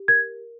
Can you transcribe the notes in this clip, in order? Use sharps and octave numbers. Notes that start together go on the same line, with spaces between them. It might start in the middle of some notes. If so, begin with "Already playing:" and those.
Already playing: G4
A#4 G#6